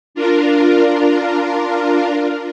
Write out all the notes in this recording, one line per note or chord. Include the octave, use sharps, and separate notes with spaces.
D4 F4 A#4